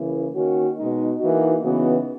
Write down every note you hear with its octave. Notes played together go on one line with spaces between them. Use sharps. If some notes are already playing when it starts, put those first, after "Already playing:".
Already playing: C#3 E3 A#3 E4
D#3 A#3 C#4 F#4
B2 G#3 D#4
E3 A#3 D#4 F#4
C#3 E3 B3 D#4 F#4